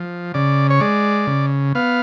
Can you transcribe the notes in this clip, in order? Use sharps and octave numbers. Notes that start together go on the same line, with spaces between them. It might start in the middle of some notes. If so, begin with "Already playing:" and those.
Already playing: F3
C#3 D5
C#5
G#3 D5
C#3
B3 F5